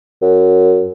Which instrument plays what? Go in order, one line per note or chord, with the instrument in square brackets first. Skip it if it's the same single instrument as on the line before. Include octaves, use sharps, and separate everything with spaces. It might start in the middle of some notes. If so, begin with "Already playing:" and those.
[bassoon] F#2